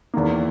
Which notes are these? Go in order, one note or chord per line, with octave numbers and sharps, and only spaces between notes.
E2 D#3 A#3